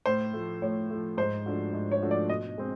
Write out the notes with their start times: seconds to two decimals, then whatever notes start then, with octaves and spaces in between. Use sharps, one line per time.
0.06 A2 C5
0.33 F3 A3
0.62 A2 C#5
0.90 F3 A3
1.17 G#2 C5
1.46 F3 A3 D4 F#4
1.73 G#2
1.91 C#5
2.02 F3 A3 D4 F#4
2.11 D5
2.29 B2 D#5
2.58 G#3 C4